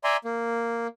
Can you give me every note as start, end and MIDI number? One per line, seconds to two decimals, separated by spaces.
0.04 0.17 74
0.04 0.17 76
0.04 0.17 80
0.04 0.17 82
0.04 0.17 84
0.25 0.87 58